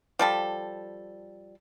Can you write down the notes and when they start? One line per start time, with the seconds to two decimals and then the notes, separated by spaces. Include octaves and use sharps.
0.19 F3 G3 A4